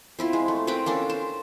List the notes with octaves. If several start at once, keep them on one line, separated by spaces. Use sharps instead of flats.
C4 E4 F4
G#3
A3
C4 A#4 B4 G5
A#3 C#4 D4 A4
C5